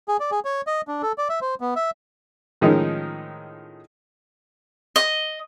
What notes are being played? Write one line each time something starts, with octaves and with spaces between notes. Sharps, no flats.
G#4
D5
G#4
C#5
D#5
D4
A4
D5
E5
C5
B3
E5
A2 D#3 F3 G#3 C#4 D#4
D#5